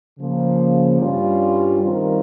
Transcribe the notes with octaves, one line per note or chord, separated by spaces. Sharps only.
C#3 F3 A#3
G2 G3 C#4 F4
D#3 G3 C4 F4 A#4